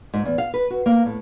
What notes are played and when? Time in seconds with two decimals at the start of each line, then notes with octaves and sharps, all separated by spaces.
0.14 G#2
0.25 E2
0.38 F5
0.54 B4
0.70 F#4
0.86 A#3
1.06 A2